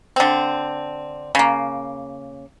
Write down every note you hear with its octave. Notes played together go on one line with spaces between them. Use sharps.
D3 C4
C#3 A#3